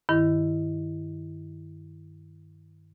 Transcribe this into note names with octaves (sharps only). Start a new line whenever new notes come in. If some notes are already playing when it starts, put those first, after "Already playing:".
G2 D#3 E4